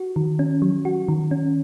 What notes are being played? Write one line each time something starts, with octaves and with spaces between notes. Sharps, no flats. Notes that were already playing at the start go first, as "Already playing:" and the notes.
Already playing: F#4
D#3
C#4
F#3
F#4
D#3
C#4